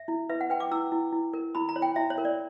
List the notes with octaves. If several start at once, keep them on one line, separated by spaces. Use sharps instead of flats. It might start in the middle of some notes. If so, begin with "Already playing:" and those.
Already playing: E5
E4
B4 E5
F#5
B4 G5
D6
E4 E6
E4
E4
A#4
E4 B5
A#5
C#5
G5
E4 E5
C#5
A#4
D5